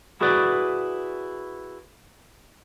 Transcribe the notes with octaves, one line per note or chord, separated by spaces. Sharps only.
E4 F#4 G#4 B4 D5